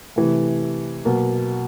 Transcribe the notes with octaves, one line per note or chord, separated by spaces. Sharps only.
C3 E3 A3
B2 F#3 A#3